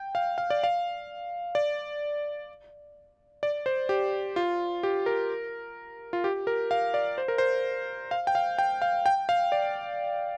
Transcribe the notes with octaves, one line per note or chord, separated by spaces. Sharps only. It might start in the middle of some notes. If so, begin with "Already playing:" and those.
Already playing: G5
F5
F5
D5
F5
D5
D5
C5
G4
F4
G4
A#4
F4
G4
A#4
F5
D5
C5
A#4
C5
F5
G5
F5
G5
F5
G5
F5
D5